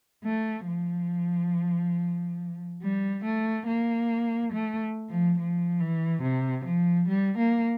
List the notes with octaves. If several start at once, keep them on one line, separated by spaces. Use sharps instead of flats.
A3
F3
G3
A3
A#3
A3
F3
F3
E3
C3
F3
G3
A#3